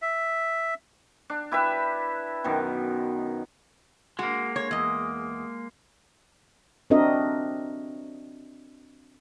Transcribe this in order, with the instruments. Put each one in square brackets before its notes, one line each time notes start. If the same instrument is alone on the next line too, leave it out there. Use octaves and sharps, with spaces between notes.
[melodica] E5
[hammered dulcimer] D4
E4 G4 B4 E5
F#2 B2 D#3
[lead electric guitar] G#3 A#3 [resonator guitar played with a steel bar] F#4
[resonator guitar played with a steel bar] C#5
E2 D#5
[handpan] C4 D4 F#4 A#4 D#5 E5